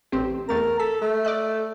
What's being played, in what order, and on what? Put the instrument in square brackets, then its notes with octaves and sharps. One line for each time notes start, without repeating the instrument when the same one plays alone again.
[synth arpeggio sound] A1 C4 G4
[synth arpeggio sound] E2 A3 A6 [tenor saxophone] A#4
[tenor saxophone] A4 [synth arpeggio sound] B6
[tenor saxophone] A3
[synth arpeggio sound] D5 D#5 F#6